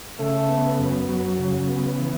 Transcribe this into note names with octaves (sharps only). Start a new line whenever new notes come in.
C#3 A3
B3
F#2
F#3
C#3
B3
E3